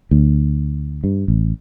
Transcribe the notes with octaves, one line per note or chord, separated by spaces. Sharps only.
D2
G2
A1